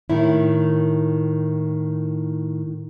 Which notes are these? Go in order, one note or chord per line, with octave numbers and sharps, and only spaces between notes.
A2 D#3 E4